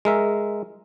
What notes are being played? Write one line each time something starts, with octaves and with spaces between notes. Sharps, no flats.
G#3 A#4 E5